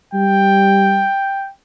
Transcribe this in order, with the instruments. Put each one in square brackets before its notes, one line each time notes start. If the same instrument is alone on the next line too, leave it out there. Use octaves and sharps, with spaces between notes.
[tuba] G3 [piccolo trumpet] G5